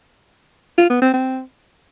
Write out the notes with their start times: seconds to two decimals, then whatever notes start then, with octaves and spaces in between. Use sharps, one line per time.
0.78 F4
0.90 B3
1.02 C4
1.14 C4